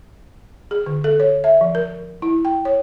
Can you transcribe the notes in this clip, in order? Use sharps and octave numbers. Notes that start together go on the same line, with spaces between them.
G#4
D3
A4
C#5
E5
F3
A#4
E4
G5
C#5